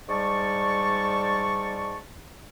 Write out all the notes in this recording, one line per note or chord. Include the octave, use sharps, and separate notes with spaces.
G#2 G3 D5 A5 C#6